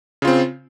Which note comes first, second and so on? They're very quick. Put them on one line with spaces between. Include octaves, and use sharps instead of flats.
C#3 F4 C4